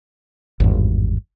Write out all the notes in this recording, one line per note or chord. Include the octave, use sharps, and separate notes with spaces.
G#1 E2 G2